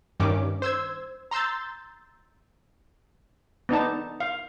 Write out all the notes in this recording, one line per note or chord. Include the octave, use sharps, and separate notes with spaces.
G2 D#3 C#4 D6
C5 E6 G#6
A#5 C6 E6 G6 A6
B3 D4 D#4 A5
F5